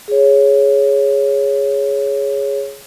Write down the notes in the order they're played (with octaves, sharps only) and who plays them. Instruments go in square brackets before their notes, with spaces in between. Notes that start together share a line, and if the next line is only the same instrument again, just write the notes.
[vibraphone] G#4 C#5